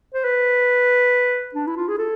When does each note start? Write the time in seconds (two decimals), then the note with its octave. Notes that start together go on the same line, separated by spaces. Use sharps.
0.14 C5
0.24 B4
1.55 D4
1.67 E4
1.76 F4
1.88 G#4
1.98 A4